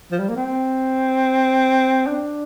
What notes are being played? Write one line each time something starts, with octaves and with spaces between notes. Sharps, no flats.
F3
G3
A#3
C4
D4